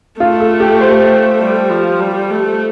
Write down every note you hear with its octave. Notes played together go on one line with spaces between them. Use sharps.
A3 F4
A4
G4
C5
G3
F3
G3
A3